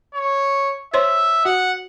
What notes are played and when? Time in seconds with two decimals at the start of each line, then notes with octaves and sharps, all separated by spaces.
0.15 C#5
0.94 C5 C#5 E5 C6
1.45 F#4 F#5